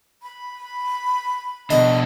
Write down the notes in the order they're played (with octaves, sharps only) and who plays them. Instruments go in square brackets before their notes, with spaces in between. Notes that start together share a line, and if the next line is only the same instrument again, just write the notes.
[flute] B5
[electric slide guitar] B2 D4 [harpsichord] D#5